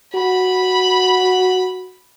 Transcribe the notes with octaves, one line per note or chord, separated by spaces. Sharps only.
F#4 B5